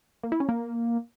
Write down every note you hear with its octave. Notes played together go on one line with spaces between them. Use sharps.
A#3
E4
C#4
A#3